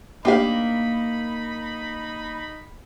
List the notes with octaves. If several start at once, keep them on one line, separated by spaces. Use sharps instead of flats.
A#3 C4 D4 D#4 G4 F5 B5